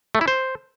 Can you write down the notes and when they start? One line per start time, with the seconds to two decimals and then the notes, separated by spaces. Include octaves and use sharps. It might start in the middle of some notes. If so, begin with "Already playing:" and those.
0.15 A3
0.21 E4
0.28 C5